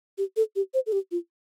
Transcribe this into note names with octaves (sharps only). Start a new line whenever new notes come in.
G4
A4
G4
C5
A4
G4
F4